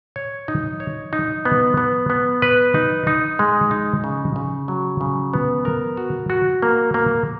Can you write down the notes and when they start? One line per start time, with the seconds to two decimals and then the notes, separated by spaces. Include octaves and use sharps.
0.16 C#5
0.48 D#4
0.80 C#5
1.13 D#4
1.45 B3
1.77 B3
2.10 B3
2.42 B4
2.74 D#4
3.07 D#4
3.39 G#3
3.71 D#4
4.04 C#3
4.36 C#3
4.68 F#3
5.01 C#3
5.33 B3
5.65 A#4
5.97 F#4
6.30 F#4
6.62 A#3
6.94 A#3